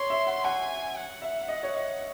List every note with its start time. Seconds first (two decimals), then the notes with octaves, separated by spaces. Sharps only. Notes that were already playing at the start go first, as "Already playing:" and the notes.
Already playing: C#5 C6
0.10 E5
0.27 F#5
0.45 F#5 G#5
0.97 F#5
1.22 E5
1.48 D#5
1.63 C#5
1.75 D#5